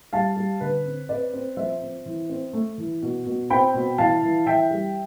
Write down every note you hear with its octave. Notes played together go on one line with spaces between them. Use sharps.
G3 F5 A5
G3
D3 B4
C4
C4 B4 D5
C4
F3 C5 E5
C4
E3
C4
A3
E3
B2
B2
C4 G5 B5
B2
E3 F5 A5
E3
E3 E5 G5
G3